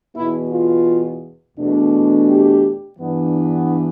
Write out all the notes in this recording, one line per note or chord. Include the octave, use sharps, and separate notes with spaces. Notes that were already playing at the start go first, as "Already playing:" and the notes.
E2 B2 B3 E4
F4
E2 B2 A3 D4
G4
G2 E3 B3 D4